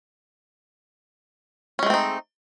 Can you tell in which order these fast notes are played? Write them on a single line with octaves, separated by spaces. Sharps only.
C#4 G#3 A3 C4 D#4